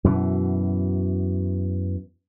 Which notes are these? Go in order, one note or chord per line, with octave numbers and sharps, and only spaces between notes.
F#2 B2 E3